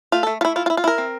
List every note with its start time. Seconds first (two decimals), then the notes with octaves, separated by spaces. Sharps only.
0.12 A3 F4
0.23 A3 A4
0.41 A3 F4
0.45 E4
0.56 E4 F4
0.66 F4
0.70 E4
0.77 F4
0.84 E4 A#4
0.98 C4